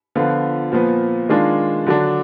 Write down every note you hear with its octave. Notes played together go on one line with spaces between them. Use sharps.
D3 F3 B3 F4
A#2 F3 B3
D#3 G#3 D4 F4
D3 F#3 D4